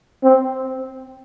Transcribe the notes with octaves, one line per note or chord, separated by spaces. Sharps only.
C4